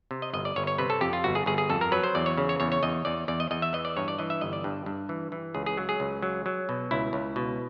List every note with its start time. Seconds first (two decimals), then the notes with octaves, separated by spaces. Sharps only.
0.11 C3
0.22 D#5
0.33 G1 D#5
0.45 D5
0.56 G1 C#5
0.67 C#5
0.78 C3 B4
0.90 A4
1.01 F2 G4
1.13 F4
1.24 G1 F#4
1.35 G#4
1.46 G1 G#4
1.58 G#4
1.70 F2 A4
1.81 A#4
1.92 F#3 B4
2.04 C5
2.15 E2 D5
2.26 C#5
2.38 C#3
2.49 C#5
2.60 E2 C#5
2.72 C#5
2.83 E2 D#5
3.05 E2 D5
3.28 E2 D5
3.40 D#5
3.51 E2 D#5
3.62 E5
3.73 E3 D#5
3.85 D5
3.97 G2 C#5
4.08 D5
4.19 E3 D#5
4.30 E5
4.41 G1 D#5
4.53 D5
4.64 G2
4.86 G2
5.09 E3
5.32 E3
5.54 C#2 G#4
5.66 G#4
5.77 F#3
5.89 G#4
6.00 C#2
6.22 F#3
6.46 F#3
6.69 B2
6.91 C#2 E4
7.13 C#2
7.36 B2